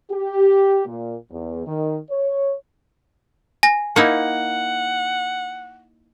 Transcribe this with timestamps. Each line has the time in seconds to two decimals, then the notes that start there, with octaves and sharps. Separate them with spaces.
0.10 G4
0.85 A#2
1.30 E2
1.66 D#3
2.10 C#5
3.63 G#5 A#6
3.96 A#3 D#4 E4 F#5